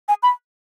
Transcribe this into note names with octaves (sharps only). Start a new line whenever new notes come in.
G#5
B5